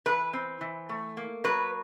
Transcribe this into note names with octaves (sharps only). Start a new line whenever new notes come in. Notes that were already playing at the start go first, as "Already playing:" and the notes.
E3 B4
C4
E3
A3
A#3
F#3 B4